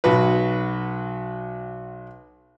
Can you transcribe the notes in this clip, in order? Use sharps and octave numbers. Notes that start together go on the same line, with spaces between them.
B1 F#4 B4